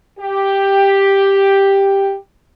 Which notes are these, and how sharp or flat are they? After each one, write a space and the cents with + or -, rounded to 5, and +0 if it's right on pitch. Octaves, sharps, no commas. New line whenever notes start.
G4 +5